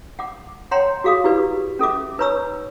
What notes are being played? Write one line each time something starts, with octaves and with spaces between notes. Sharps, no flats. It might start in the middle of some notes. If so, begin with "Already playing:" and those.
F#5 D6
C#5 F#5 G5 A#5 C6
F#4 G#4 F5 D6 D#6
E4 G4 B4 D5
C#4 A4 E5 D6
D#4 B4 C#5 A#5 C#6 E6